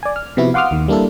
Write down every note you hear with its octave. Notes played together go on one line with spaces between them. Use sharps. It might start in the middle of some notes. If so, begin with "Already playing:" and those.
D5 G#5
F6
C3 F3 B3 E4 F#4
F5 F#5 C6 D6 D#6 F6
D#2 D#3
G3 A#3 D4 E4 A4